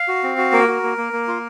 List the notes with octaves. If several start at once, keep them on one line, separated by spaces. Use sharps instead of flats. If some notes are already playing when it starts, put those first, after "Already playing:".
Already playing: F5
F#4
C4
F#4
A#3 A#4
F#4
A#3
A#3
A#3
F4